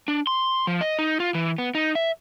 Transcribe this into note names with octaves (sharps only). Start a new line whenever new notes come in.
D4
C6
F3
D#5
D#4
F4
E3
B3
D#4
E5